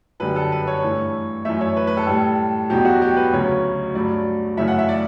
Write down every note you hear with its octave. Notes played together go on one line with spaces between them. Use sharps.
F#2 D3 G3 B4
A4
B4
C#5
G2 E3 A3
F#2 E3 A3 E5
C#5
B4
B4
A4
A2 G3 A4
E2 B2 F#3 G4
F#4
G4
B4
D2 C#3 F#3 C#5
G2 F#3 A3 D5
F#2 C#3 E3 A3 E5
F#5
E5
D5